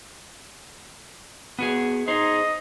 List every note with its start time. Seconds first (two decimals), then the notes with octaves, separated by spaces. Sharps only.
1.59 B3 F#4 G#4
2.08 D#4 G#4 C5 D#5